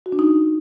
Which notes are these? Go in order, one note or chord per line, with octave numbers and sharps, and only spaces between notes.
F#4
D4
D#4